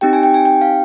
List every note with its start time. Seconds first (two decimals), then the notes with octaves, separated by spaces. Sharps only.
0.01 C4 D#4 G4 G5
0.13 G#5
0.23 G5
0.34 G#5
0.45 G5
0.61 F5